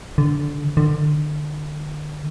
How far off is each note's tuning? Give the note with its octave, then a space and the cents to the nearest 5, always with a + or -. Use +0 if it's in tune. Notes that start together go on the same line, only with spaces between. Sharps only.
D3 -10
D3 +30